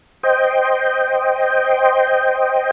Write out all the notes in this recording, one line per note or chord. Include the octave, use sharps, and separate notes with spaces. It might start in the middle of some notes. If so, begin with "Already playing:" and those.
C5 D#5 G5